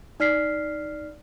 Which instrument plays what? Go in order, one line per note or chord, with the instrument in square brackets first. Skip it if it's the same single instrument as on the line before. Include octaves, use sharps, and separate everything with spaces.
[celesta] D#4 D5 F6 B6 C7